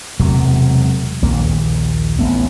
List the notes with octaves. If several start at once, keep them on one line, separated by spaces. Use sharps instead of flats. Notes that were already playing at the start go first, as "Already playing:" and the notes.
E1 C3 F#3 A3
A#1 D#2 A#3
A1 A3 B3